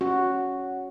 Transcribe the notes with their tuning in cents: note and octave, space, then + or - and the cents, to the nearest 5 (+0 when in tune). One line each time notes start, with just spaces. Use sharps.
C#4 +0 F#4 +0